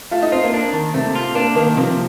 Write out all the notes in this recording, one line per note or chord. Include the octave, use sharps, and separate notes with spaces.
A3 F4 F5
D#4 D#5
C4 F4 C5
A#3 A#4
D4
D#3
C3 A3 C4
F4
A#3 D4
D#3 A#3
C3 F3 C4